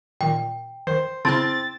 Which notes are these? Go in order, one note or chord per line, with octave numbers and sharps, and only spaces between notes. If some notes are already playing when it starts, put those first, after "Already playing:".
A#2 D#3 G5
D#3 C5
C#3 C4 E4 A5 F6 A6